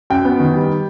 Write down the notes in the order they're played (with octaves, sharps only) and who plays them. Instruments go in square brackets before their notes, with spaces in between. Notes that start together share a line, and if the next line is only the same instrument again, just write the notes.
[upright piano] F#2 G5
B3
D#3
G3